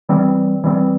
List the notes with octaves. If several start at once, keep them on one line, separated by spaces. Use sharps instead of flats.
E3 G3 C4
E3 G3 C4